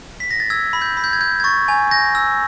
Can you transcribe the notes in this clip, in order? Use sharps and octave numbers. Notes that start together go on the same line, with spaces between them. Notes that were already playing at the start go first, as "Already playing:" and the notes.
B6
A#6
A6
E6 G#6
B5
G6
B5
G6
G#6
G6
G#6
C#6 A6
G#5
G6 A#6
E6